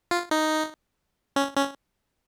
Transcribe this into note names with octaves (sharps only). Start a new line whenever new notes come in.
F4
D#4
C#4
C#4